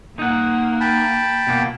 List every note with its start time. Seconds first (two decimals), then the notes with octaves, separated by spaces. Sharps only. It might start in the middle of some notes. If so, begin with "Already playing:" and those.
0.19 A#3 D#4 F#5
0.81 G5 A5 B5
1.47 B2 A#3